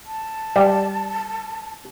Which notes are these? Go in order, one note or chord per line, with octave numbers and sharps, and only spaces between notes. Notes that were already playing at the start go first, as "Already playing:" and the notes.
A5
G3